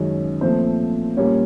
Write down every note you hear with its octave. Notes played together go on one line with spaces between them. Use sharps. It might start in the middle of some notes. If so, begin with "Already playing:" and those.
Already playing: F#2 D#3 G#3 C#4 C#5
A#2 F3 A3 C4 C5
A#2 G3 A#3 C#4 C#5